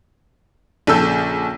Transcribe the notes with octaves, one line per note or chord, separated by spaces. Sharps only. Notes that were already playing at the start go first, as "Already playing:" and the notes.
A#1 C#3 A4 E6 G6